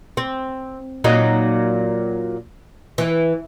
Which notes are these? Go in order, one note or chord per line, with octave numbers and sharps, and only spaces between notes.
C4
A#2 F#3 D#4
E3